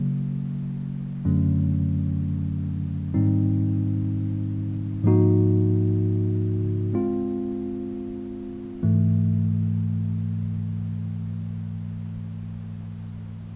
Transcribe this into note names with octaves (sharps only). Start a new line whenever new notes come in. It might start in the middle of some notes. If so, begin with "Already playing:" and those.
Already playing: C#3 F#3 A#3
F#2 D3 F#3 A3 C#4
G#2 D#3 G3 C4 D#4
G#2 F3 A#3 D#4 F#4
G#3 C4 F4
G#2 E3 A3